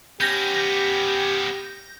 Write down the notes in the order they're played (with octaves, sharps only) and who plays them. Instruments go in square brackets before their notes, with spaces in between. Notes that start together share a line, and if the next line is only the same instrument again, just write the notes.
[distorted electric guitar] B3 C#4 [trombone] G4 [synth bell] G6 A#6